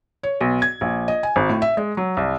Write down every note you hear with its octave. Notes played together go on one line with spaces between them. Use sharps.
C#5
B1
G#6
A#1
D#5
G#5
G#1
A2
E5
G#3
F#3
C2